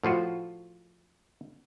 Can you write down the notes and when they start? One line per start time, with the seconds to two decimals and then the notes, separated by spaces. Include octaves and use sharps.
0.03 A2 F3 F4 F#4